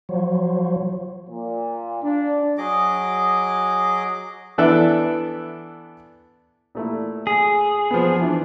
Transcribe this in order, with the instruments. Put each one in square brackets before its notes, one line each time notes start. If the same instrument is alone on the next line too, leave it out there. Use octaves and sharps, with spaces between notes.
[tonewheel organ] F3 F#3
[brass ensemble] A#2
D4
[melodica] F#3 G#4 D#5 D6
[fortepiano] E3 B3 D4 A4 E5 F#6
A#2 A3 E4
[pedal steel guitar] G#4
[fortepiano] F3 B3
E3 D4